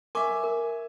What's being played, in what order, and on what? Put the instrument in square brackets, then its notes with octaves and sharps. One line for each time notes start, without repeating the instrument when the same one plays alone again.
[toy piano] A#4 C#6 D6 [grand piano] E5 G#5
[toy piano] A#4